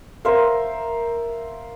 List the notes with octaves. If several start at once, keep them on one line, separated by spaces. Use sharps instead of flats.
A#4 C5 E5 F5